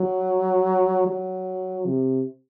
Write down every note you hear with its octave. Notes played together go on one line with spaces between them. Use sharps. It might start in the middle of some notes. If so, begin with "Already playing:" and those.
Already playing: F#3
F#3
C3